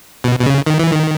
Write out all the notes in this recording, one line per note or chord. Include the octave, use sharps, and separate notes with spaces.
B2
B2
C#3
D#3
E3
D#3